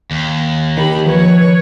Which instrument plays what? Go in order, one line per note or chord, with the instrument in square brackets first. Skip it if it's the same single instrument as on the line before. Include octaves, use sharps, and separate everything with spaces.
[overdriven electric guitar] D#2
[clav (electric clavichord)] D#3 [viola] G4 B5
[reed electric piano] F3 [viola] B4 C#5